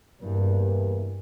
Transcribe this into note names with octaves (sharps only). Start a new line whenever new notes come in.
E2 G2 C3 E3 G3 A#3